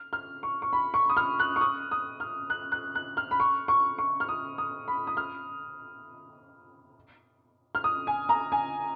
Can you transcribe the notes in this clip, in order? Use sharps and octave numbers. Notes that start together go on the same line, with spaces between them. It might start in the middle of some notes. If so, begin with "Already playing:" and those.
Already playing: F6
F6
C#6
C#6
B5
C#6
D#6
F6
F#6
C#6
D#6
D#6
F6
F#6
F#6
F#6
F6
B5
C#6
C#6
C#6
F6
D#6
D#6
B5
D#6
F6
F6
D#6
G#5
A#5
G#5